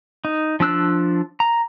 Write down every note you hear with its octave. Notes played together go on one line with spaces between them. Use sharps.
D#4
F3 D4 E6 F#6
A#5